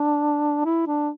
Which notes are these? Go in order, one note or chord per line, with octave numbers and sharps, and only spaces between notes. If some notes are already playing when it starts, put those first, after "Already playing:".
Already playing: D4
E4
D4